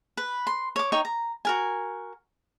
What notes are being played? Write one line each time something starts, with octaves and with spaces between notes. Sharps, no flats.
B4
C6
C#5 D6
D#4 C#5 G5 C#6
A#5
F#4 A#4 G#5